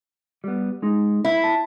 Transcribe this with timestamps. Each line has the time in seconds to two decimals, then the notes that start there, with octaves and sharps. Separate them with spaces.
0.44 G3 B3
0.82 G#3 D#4
1.24 A#3 E4
1.44 A5